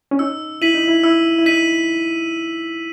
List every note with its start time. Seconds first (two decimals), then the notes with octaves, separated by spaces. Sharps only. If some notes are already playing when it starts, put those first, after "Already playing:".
0.11 C#4
0.19 D#4 E6
0.62 E4 B6 D#7 F#7
0.74 D#4
0.87 E4
1.03 E4 E6
1.39 E4
1.46 D#4 B6 D#7 F#7